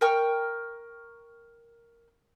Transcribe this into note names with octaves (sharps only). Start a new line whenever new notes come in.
A#4 G5 C#6 F6